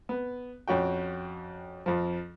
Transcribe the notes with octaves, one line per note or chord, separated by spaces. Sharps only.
B3
F2 C#4 F#4 G5
F2 F3